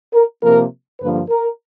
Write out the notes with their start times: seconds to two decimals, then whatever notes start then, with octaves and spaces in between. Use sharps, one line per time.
0.13 A#4
0.42 C3 F3 A#3 A#4
1.00 G2 D3 F3 A#3 B4
1.29 A#4